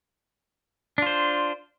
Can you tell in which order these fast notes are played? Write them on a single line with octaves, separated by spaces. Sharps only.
D4 F4 C5